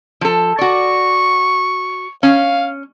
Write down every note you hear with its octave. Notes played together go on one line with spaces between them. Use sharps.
F3 A4
F#4 D5 C#6
C#4 F5